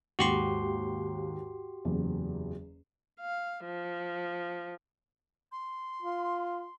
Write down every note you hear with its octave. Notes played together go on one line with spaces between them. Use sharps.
D#2 G#2 F#4 G4 C6
F#1 E2
F5
F3
C6
F4